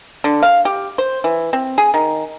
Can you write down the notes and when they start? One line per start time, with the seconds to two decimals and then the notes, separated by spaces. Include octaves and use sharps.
0.24 D3
0.43 F5
0.65 G4
0.98 C5
1.24 E3
1.53 C4
1.78 G#4
1.94 D#3